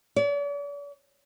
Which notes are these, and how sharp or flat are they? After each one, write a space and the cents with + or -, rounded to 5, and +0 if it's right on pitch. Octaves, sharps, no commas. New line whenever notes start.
D5 -45